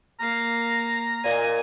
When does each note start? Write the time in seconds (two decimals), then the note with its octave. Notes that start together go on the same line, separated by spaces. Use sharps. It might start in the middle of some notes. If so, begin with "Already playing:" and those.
0.20 A#3 F5 A#5
1.23 A#2 D#5 G#5